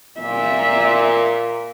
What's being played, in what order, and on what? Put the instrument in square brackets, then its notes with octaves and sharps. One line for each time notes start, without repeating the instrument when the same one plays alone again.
[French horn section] A#2 [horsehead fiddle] E5